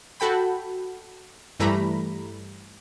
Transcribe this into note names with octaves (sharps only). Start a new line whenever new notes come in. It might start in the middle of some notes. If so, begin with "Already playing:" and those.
F#4 A4 G5 B5
G2 E3 G3 A3 A#5 B5